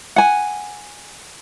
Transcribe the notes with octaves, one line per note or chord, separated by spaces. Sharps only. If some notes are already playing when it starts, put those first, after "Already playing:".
F#5 G#5